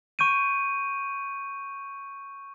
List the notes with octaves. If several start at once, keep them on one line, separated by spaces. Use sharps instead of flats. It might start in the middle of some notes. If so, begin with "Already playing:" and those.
C#6 G6 D7 D#7